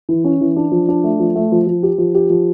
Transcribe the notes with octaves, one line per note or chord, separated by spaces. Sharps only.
E3
C#4
E3
D4
F3
D4
A3
F3
A3
F3
F3
G4
F3
G4
F3